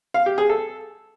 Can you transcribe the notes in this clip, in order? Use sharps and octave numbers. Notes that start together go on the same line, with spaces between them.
F5
G4
G#4
A4